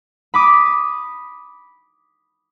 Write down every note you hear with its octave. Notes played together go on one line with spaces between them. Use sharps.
B5 D6 D#6